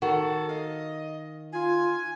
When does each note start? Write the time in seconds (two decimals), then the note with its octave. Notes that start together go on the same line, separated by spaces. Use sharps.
0.02 D#3 F#4 A4
0.49 D#5 F5
1.52 F4 G#5